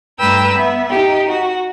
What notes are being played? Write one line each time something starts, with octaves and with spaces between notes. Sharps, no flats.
G2 A3 B4 G5 A#5 E6
B3 E5
D#4 G4
F#4